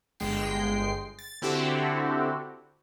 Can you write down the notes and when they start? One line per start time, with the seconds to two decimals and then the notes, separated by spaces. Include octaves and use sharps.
0.20 G1 G#3 G5 C7
1.19 A6
1.42 D3 C4 E4 F#4 G4 A4